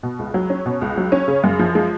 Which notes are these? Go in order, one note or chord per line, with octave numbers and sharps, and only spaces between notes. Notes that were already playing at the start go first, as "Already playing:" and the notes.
B2
C#2
F#3
C#4
B2
C#2
F#3
C#4
C#3
F#2
F3
G#3